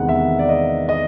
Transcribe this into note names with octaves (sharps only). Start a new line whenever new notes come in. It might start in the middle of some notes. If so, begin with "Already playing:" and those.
Already playing: E2 C3 D#3 G#3 B3 F#5
E5
D5
D#5
D#5